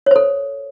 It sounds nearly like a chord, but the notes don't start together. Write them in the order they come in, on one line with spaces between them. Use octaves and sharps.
C#5 C5 A4